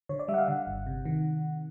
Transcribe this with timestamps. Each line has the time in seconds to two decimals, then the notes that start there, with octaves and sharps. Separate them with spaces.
0.09 D3 C#5
0.19 D5
0.28 G3 E5
0.34 F#5
0.38 F5
0.48 D3 F#5
0.67 G1
0.86 C3
1.05 D#3